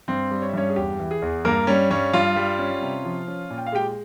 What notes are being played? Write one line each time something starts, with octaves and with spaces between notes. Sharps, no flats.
G2 C4 C5
G3
C#5
E5
G2 C#4 C#5
G#4
E2 G4
E3
G#4
E2
G2 A#3 A#4
G3 C#4 C#5
G2 C#4 C#5
G2 F4 F5
G3
C#4
C3
F3
C#4
A#2
G5
F5
G#3 G4 G5